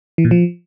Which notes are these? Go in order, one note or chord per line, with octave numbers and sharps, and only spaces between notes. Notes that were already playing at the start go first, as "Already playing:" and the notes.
E3
A#2
F3